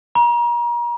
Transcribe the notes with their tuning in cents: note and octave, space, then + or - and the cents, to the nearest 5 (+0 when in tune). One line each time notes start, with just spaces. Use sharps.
A#5 +35